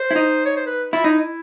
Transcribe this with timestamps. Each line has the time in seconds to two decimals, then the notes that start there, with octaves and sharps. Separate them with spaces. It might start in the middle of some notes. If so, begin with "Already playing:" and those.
Already playing: C5
0.11 E4
0.16 D#4
0.45 C#5
0.56 C5
0.66 B4
0.93 E4 F4
1.04 D#4 E4